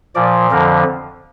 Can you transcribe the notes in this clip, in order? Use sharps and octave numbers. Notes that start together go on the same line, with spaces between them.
A#2 F3 D5
F2 D3 F3 A#4